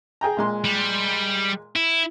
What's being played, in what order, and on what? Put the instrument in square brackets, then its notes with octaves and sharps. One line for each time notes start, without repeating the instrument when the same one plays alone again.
[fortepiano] G#4 G5 A#5
A#2 G#3 C6
[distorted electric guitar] G3
E4